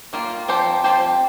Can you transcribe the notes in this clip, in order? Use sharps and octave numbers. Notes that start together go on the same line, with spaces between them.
D#3 A#3 F4
F3 C4 G4 C5
F3 C4 G4 C5